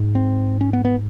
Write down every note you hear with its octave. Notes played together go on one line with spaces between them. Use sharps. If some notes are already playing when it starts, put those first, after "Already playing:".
Already playing: G#2
C4
C#4
B3
B3